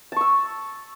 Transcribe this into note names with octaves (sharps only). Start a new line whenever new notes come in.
A5 C#6 E6